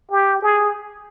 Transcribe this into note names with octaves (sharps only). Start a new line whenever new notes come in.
G4
G#4